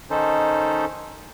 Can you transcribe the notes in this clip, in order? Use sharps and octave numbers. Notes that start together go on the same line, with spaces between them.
D#3 C#4 D#4 A4 C5